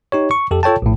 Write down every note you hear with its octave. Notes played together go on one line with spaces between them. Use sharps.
D#4 G4 C#5
C#6
F2 G4 A4
F4 A4 C#5 G5 A5
A#1 A2